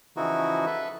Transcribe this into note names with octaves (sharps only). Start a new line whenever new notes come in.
C#3 E3 F3 D#4 E4 F#4
A4 B4 E5